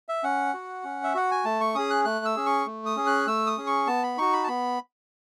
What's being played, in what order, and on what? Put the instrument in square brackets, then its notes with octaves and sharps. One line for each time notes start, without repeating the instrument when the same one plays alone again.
[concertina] E5
C#4 F#5
F#4
C#4
E5
F#4 F#5
G#5
A3 A5
C#6
C#4 G#4 D#6
F#6
A3 F#6
E6
C#4 G#4
C#6
A3
D#6
C#4 G#4
F#6
A3 E6
D#6
C#4 G#4
C#6
B3 A5
B5
D#4 F#4 C#6
B5
A5
B3 B5